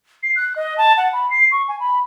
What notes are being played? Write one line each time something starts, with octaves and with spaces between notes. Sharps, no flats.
C7
F#6
D#5
A5
F#5
B5
C7
C#6
G#5
B5